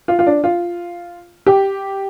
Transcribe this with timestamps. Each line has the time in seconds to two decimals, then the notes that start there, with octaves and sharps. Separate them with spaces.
0.08 F4
0.19 F4
0.27 D4
0.44 F4
1.46 G4